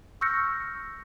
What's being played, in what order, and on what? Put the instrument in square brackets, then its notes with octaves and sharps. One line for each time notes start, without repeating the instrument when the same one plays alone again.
[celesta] C#6 E6 F6 G6 A#6 C#7